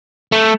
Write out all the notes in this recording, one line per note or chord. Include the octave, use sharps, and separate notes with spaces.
A3